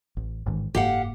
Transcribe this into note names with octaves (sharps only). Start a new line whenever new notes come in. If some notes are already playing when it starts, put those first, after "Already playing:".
A1
A1 G#2 D#3
F#1 G#2 A#3 G4 F5 F#5